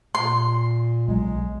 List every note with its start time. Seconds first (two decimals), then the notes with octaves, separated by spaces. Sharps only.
0.15 A#2 C6
1.08 B1 D#3 F#3 G#3